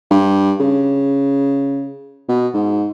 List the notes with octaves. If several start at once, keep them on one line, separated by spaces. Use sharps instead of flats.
G2
C#3
B2
G#2